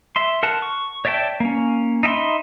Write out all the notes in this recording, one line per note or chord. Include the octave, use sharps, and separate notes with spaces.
E5 C6
A#4 F#5 A5
C#6
C#5 D5 E5 G5 A5
A#3 C#4
D#4 E5 G5 B5 C6